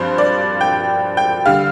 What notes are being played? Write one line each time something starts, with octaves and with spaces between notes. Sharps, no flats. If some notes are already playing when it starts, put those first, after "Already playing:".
Already playing: G2 F3 C4 C5
D5
G5
G5
D3 G3 F5